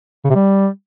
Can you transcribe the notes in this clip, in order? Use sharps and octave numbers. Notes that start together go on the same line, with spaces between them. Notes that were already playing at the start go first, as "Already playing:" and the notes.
C#3
C3
G3